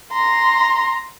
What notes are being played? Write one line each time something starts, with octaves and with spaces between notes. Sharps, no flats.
A#5 C6